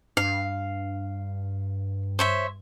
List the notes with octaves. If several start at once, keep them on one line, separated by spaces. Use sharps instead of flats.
G2 F5
C5 C#5 E5